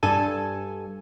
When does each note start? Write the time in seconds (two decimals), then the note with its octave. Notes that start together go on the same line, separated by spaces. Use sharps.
0.03 G2 A4 G#5